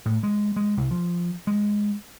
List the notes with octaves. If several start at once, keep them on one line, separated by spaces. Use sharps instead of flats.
A2
G#3
G#3
C2
F3
G#3